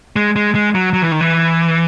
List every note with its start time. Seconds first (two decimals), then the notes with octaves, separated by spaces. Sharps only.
0.16 G#3
0.36 G#3
0.55 G#3
0.75 F#3
0.93 F#3
1.02 E3
1.12 D#3
1.21 E3